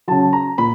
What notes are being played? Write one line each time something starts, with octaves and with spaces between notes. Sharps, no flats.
C#3 F#3 A5
A#5
A#2 B5